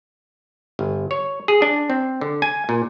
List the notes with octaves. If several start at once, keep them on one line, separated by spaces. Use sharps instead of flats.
G1
C#5
G#4
D4
C4
D3
G#5
A#2